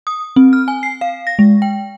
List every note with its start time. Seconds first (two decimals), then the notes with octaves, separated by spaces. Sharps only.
0.07 D#6
0.36 C4
0.53 F6
0.68 G#5
0.83 C7
1.01 F5
1.27 A#6
1.39 G#3
1.62 G5